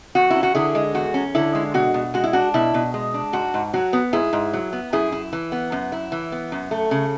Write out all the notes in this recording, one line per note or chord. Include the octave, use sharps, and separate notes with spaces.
E2 F#4
C#4 E4
F#4
D3 E4 G#4
G#3
E2 F#4
C#4
D3 E4
G#3
B2 F#4
B2
G#3 F#4
E4
D4 F#4
B2 E4
B2
G#3
D4
G#2 F#4
G#2
F#3 F#4
B3
G#2 E4 G#4
G#2
F#3
B3
F#2 E4 G#4
E4
E3
B3
F#2
E4
E3
B3
F#2
A3
C#3